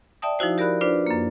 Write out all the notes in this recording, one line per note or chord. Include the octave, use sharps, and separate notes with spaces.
D5 E5 G5 A5 D#6
F3 D#4 E4 F#4 C5
G4 A#4 D5 B5 F#6
D4 F4 B4 C5 D5
F#2 A#3